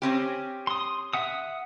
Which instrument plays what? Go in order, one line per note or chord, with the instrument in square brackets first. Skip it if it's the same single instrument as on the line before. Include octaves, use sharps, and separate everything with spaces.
[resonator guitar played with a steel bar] C4 C#4 G4
[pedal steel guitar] C6 D#6
E5 F#5 D#6